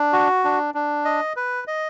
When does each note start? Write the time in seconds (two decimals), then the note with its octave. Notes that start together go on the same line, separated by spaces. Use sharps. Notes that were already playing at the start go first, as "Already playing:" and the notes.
Already playing: D4
0.13 F#4
0.44 D4
0.74 D4
1.05 D#5
1.36 B4
1.67 D#5